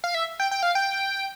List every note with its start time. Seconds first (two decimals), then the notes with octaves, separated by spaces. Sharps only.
0.04 F5
0.15 E5
0.40 G5
0.51 G5
0.63 F5
0.75 G5